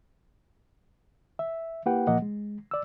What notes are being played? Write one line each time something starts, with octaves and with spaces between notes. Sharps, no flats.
E5
A#3 E4 G4 B4 F#5 G5
A#2 F3 A#3 D#5 F#5
G#3
D5 E6